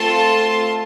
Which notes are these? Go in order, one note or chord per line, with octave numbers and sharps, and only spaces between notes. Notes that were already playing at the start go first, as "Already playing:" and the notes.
Already playing: A3 C4 F4 A4 A5 C6